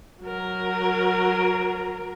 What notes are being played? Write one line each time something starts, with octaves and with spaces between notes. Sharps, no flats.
F#3 A#4